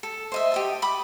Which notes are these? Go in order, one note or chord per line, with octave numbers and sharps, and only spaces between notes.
A4
C5 D#5 E5
G4 D#5 A5
B5 D6 D#6